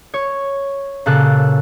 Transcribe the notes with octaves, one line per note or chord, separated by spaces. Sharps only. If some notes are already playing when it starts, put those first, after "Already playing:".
C#5
A#2 C#3 A4 F#6